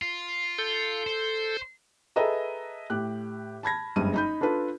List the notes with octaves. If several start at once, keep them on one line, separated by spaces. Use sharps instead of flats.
F4
A4 G6
C5
G#4 A4 B4 D#5 E5 A#5
A2 G4 F#6
A5 B5 G#6 A#6
F#1 G2 G#3 D#7
D#4 B5 G6
D4 F4 A4 B4